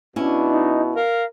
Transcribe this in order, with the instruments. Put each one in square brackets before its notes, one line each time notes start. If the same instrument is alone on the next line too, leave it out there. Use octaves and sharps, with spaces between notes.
[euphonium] B2 [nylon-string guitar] C#4 E4 [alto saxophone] D4
[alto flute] D#4
[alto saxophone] A#4 [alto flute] F5